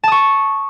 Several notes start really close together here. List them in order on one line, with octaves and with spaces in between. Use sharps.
A5 D#6 C#6